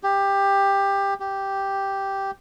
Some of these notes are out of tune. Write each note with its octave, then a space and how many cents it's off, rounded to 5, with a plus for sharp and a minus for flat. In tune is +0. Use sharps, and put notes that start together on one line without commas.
G4 +15
G4 -5